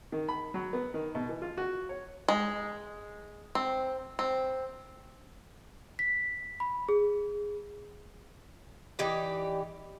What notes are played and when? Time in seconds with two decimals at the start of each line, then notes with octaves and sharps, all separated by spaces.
0.12 D#3
0.28 B5
0.54 F#3
0.73 B3
0.94 D#3
1.15 B2
1.29 E3
1.42 F4
1.57 F#4
1.89 C#5
2.28 G#3
3.55 C4
4.19 C4
5.99 B6
6.60 B5
6.89 G#4
8.99 E3 D#4 G4 D5